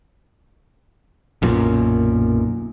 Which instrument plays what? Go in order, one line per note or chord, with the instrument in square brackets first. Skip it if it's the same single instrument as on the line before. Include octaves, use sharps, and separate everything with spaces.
[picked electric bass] B1 F#2 A#2